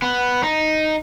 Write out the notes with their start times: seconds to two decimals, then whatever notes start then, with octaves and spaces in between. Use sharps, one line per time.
0.02 B3
0.43 D#4